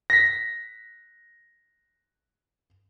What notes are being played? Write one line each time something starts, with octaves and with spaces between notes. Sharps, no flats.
A#6 B6